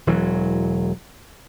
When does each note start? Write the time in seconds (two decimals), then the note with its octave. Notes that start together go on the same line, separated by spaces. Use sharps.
0.07 E1 E3 F#3